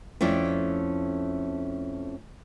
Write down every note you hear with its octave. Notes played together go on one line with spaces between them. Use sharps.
F2 A3 C#4 E4 D5